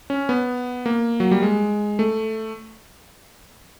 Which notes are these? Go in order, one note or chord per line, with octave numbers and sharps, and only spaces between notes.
C#4
B3
A#3
F#3
G3
G#3
A3